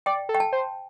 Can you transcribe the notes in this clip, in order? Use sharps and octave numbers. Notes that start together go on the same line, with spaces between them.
D5 G5
A4
G5
A5
C5